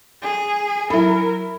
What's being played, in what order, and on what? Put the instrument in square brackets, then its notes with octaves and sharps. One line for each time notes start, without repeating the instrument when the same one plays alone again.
[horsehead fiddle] G#4
[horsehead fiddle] F#3 A#4 [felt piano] E4 B5